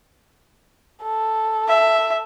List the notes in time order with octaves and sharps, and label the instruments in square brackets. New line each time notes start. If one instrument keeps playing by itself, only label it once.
[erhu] A4
[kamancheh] E5